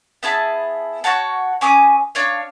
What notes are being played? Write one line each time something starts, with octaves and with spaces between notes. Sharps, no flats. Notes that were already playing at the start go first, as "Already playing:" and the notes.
B3 E4 G#4 A5
F#4 C#5 F#5 A5
C#4 G#5 D6 D#6
D4 C#5 F5